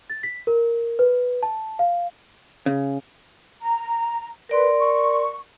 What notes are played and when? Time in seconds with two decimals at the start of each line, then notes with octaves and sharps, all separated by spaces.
0.10 A6
0.23 B6
0.47 A#4
0.99 B4
1.43 A5
1.79 F5
2.66 C#3
3.61 A#5
4.49 A#4 B4 D5 C6
4.78 C#6